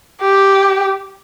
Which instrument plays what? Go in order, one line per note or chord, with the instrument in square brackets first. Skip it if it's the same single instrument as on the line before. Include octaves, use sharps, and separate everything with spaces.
[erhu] G4